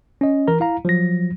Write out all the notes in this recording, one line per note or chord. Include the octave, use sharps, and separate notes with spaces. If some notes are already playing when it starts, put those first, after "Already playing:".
C#4 D#5
E3 A#4 A#5
E4 F5 A#5
F3 F#3 A#6